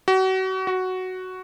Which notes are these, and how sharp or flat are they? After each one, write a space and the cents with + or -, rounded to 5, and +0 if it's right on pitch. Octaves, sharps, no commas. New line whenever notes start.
F#4 +35
F#4 +5